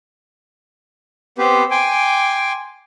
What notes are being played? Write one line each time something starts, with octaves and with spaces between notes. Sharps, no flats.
B3 C4 G4 B4 C5
G5 G#5 C6 D6